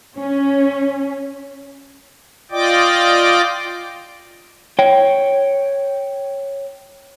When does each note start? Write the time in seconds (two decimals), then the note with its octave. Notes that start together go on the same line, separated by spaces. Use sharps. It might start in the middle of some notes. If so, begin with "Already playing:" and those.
0.18 C#4
2.51 F4 D5 D#5 G5 D6
4.79 C#5 G5